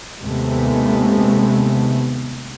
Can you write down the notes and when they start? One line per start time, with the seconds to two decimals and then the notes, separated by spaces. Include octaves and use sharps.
0.21 D#2 C3 G#3 A3 B3